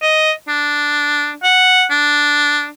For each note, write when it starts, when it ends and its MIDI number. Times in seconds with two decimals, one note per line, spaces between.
0.02 0.32 75
0.48 1.33 62
1.43 1.85 78
1.91 2.68 62